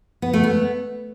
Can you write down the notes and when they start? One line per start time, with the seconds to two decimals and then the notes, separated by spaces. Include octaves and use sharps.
0.22 B3
0.34 A3
0.44 B3